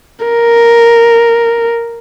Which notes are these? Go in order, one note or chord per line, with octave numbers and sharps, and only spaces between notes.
A#4